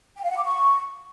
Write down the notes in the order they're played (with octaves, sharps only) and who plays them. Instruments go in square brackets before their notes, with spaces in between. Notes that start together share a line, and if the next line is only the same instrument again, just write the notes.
[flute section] G5
F5
F#5
D6
C#6